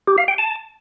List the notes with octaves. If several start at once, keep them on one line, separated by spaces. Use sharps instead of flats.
G4
F5
G5
A5